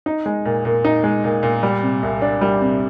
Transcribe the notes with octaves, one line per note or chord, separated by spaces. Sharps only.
D#4
G#3
A#2
A#2
D#4
G#3
A#2
A#2
G3
C3
C2
D4
G3
C3